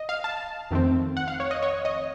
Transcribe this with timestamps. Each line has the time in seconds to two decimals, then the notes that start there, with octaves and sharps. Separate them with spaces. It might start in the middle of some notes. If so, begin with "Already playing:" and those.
Already playing: D#5
0.09 F5
0.24 A5
0.71 F2 D#3 A3 C4
1.17 F#5
1.28 F5
1.40 C#5
1.51 D#5
1.62 C#5
1.85 D#5